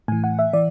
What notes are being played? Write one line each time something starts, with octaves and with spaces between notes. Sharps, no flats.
A2 E3 G#5
F#5
E5
E3 D5